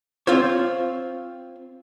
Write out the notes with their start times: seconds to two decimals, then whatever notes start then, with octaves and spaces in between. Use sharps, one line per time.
0.27 C4 F4 C5 C#5